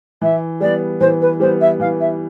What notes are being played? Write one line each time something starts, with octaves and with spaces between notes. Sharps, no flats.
E3 E5
G3 B3 D5
E3 C5
B4
G3 B3 C5
E5
E3 F5
E5